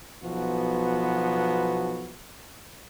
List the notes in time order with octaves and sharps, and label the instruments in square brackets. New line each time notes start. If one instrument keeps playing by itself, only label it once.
[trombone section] B1 F3 B3 F#4